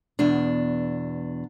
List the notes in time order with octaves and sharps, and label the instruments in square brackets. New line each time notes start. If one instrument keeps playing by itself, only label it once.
[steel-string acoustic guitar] E2 B2 D4